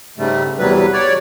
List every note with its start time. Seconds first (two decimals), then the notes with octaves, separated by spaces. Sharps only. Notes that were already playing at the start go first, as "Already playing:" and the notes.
0.18 G#2 C#3 G3 A3
0.59 E2 C3 F#3 G3 B4
0.93 C#5 D5